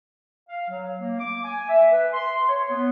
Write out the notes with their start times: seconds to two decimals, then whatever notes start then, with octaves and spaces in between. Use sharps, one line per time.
0.49 F5
0.70 F#3
0.99 A#3
1.20 D6
1.44 G#5
1.69 E5
1.92 B4
2.13 C6
2.49 C#5
2.69 B3